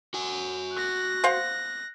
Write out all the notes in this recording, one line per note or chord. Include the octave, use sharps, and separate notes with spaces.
F#4 G#5
F#6 A#6
C5 F5 F#5